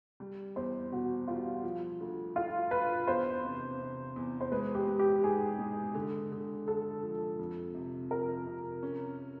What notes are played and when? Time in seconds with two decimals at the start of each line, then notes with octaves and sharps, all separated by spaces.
0.20 G3
0.56 E2 C5
0.92 B2 F#4
1.27 G3 F4
1.64 F3
2.00 D2
2.35 D2 F4
2.71 D2 B4
3.07 E2 C5
3.44 C3
3.80 C3
4.16 E2
4.41 C5
4.52 G#3 B4
4.75 G4
4.87 G#3
4.99 G4
5.23 G#2 G#4
5.59 G#3
5.95 D3
6.32 D3
6.66 D3 A4
7.03 F3
7.39 F2
7.74 C3
8.11 F3 A#4
8.47 C3
8.83 C#4